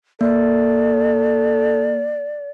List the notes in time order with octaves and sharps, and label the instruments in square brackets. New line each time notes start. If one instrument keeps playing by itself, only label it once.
[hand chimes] A#3 [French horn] A4 [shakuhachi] D5